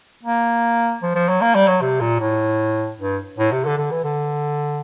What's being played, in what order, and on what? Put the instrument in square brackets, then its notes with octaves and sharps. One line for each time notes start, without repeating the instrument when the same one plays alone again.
[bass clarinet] A#3
F3
F3
F#3
A#3
G3
F#3
C3
A#2
A2
G2
A2
C3
D3
D3
E3
D3